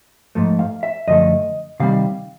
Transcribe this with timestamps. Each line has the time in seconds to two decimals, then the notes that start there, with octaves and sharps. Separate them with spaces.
0.35 G#2 F3 A3
0.59 F5
0.83 E5
1.08 F#2 D3 F3 A3 D#5
1.80 C3 D#3 G3 F5